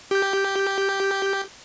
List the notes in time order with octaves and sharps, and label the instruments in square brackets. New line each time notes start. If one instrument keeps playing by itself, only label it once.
[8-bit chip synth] G4 G6